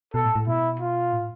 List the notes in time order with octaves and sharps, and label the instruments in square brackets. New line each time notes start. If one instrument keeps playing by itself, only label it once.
[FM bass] B2 [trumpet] A4
[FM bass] A2
A2
[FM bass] B2 [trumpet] E4
[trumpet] F4
[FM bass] A2